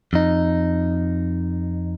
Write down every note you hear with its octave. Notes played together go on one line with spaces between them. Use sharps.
F2 D#4